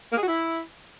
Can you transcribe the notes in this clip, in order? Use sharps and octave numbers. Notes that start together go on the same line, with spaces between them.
A#3
G#4
F#4
E4